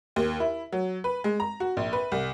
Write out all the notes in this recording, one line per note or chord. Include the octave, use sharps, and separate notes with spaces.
D#2
E4
F#3
B4
G#3
A#5
F#4
A#1
B4
C2